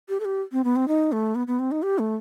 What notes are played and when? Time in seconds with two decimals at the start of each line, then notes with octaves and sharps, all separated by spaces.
0.09 G4
0.20 A4
0.25 G4
0.52 C4
0.64 B3
0.76 C4
0.88 D#4
1.12 A3
1.35 B3
1.47 B3
1.59 C4
1.71 D#4
1.83 G4
1.99 A3